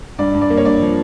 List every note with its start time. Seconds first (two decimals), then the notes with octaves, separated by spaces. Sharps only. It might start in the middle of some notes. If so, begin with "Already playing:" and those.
0.18 G2 D5
0.34 G2
0.42 D5
0.50 A#3
0.57 C#5
0.65 G2 D5
0.81 F3